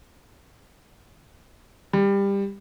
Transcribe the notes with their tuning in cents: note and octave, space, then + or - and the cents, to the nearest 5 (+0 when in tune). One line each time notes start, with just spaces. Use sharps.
G3 +20